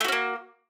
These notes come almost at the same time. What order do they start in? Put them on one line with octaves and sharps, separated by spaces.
A3 F#4 C#4 A#3